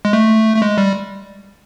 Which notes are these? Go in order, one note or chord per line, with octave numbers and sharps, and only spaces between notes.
G#3
A3
A3
G#3
G3